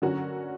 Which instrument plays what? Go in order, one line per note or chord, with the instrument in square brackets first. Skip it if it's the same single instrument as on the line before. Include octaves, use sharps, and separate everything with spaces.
[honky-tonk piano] D3 F#3 C#4 F#4 A#4